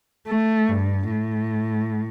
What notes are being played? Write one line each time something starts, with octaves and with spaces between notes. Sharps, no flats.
A3
G2
A2